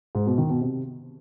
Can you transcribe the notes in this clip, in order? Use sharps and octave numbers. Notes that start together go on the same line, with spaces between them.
G#2
B2
D#3
B2
C3